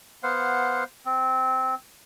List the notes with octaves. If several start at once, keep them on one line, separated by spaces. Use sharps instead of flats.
B3 C5 F5 F#5
C4